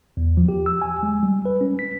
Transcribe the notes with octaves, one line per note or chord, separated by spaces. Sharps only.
E2
F3
G4
E6
G#5
G#3
G3
B4
C#4
B6